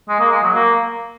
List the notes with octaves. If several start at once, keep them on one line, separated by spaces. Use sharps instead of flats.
G#3
A#3
G#3
F#3
A#3